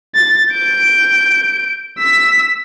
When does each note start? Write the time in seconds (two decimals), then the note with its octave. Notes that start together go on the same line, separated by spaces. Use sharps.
0.15 A6
0.52 G6 D7
1.99 E6 B6